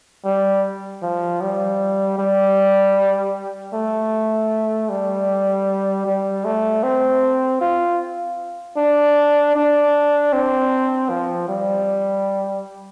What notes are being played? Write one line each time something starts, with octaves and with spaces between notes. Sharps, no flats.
G3
F3
G3
G3
A3
G3
G3
A3
C4
F4
D4
D4
C4
F3
G3